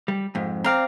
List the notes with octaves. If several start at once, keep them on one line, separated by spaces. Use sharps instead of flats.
G3
F2 G#2
C4 D5 F5 A#5